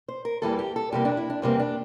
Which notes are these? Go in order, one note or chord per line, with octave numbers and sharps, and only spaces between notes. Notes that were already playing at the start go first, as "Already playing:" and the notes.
C5
A#4
E2 E3 G3 A#3 A4
G4
A4
E2 C3 G3 A#3 G4
D4
E4
D4
E2 C3 G3 A#3 C4
D4